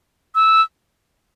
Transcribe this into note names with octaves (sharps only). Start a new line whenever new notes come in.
E6